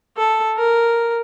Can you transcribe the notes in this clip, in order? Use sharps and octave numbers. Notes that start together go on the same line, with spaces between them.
A4
A#4